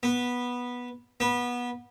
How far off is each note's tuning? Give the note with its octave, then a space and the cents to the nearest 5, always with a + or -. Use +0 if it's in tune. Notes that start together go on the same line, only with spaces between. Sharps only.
B3 -10
B3 -20